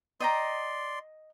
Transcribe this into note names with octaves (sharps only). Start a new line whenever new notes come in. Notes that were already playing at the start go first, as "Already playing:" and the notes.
D5 D#5 G5 A#5 C6